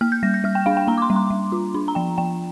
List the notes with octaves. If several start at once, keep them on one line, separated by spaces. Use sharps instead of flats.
A#3 F6
G6
G3 A#6
G6
G3 F6
G5
D4 F5
G5
A#3 A#5
D6
C6
G3
C6
G3
F4
D4
A#5
F3 G5
F3 G5